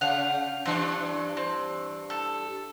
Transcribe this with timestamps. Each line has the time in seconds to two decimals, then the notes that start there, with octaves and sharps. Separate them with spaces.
0.01 C#3 F5 F#5
0.66 G2 E3 C4 D4
1.37 C4
2.10 A4